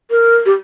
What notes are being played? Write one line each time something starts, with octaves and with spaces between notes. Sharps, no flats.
A#4
G4